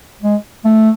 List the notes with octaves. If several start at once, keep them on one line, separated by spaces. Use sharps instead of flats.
G#3
A3